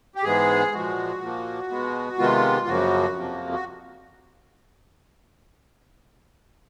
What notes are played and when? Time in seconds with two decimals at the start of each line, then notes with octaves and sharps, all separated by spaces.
0.16 G4
0.23 G#2 E3 G#3 B3 G#4
0.72 A#2 F3 G#3 F#4
1.21 A#2 F3 A#3
1.70 B2 G#3 B3
2.18 C3 D#3 G#3 B3 F4
2.67 F#2 C#3 F3 A#3 F#4
3.15 F2 C3 F3 A#3
3.53 F#4